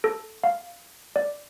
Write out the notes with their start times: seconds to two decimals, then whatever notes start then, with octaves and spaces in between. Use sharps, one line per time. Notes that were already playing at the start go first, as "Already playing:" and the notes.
0.04 A4
0.44 F5
1.16 D5